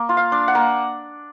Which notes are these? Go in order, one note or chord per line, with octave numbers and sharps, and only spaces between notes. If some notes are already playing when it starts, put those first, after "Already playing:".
Already playing: A#3
F4
F5
D4
F#5
A#3